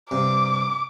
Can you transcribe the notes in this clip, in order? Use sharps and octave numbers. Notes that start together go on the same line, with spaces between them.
G2 C3 D6